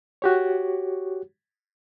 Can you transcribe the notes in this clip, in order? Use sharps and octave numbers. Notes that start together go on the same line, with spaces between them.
F#4 G4 C#5